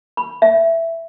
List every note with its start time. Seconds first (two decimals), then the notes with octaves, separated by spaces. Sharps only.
0.17 B5
0.42 E5